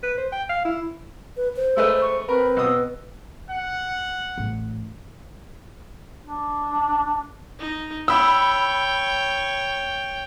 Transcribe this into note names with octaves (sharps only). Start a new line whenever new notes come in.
B4
C5
G5
F5
E4
B4
C5
G#3 A3 B4 E6
C#6
C4 A#4 B4 B5
B2 D#6 E6
F#5
A1
D4
D#4
C#5 G5 B5 E6